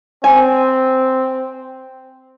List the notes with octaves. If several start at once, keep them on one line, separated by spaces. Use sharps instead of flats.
C4 G#5